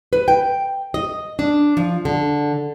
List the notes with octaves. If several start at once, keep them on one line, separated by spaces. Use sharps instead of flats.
B4
G5
D#5
D4
F3
D3